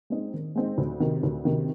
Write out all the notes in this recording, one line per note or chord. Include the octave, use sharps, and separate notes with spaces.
G#3 C4 D#4
D#3
G#3 C4 D#4
D2
C3 D#3
D2
C3 D#3